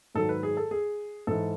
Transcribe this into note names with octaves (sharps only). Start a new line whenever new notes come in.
G#2 D#3 F#3 A4
B4
G#4
A4
G#4
G#2 E3 A4